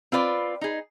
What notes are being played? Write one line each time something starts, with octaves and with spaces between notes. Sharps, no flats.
C4 F4 B4 D5
D#4 G#4